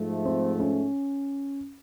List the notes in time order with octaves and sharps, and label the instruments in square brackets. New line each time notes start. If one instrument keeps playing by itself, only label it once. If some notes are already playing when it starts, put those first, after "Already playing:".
Already playing: [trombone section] G#2 F3 A3
[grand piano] C4
C#4